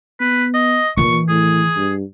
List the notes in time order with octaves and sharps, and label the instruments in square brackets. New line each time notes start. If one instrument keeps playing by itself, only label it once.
[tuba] B3 [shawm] B4
[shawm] D#5
[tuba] A#2 [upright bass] D#3 E3 [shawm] C#6
[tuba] A2 [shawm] G#4
[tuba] G2